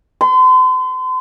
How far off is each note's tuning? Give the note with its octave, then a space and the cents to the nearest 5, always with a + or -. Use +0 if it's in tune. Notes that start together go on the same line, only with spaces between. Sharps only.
C6 -40